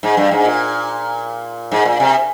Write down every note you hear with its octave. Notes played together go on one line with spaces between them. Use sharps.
G#2
G2
G#2
A#2
G#2
A#2
C3